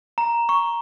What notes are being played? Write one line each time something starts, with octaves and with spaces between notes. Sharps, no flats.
A#5
C#6